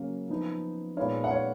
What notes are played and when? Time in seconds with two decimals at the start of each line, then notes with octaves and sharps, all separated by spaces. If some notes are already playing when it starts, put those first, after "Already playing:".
Already playing: C#3 F#3 A#3 C#4 F5
0.29 F3 B3 D#4
0.96 A#2 G#3 B3 D#4 C#5 F5
1.24 F#5
1.30 C#5 F5